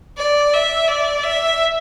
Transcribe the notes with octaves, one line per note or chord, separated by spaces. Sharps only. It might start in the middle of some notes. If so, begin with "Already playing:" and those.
D5
E5
D5
E5